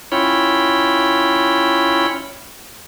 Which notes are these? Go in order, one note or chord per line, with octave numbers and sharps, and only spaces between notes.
C#4 E4 F4 C#5 G5 B5